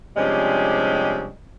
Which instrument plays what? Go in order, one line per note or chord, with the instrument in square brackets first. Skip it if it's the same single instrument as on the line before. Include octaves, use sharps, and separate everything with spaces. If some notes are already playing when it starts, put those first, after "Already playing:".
[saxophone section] C3 F3 G3 G#3 C#4 D4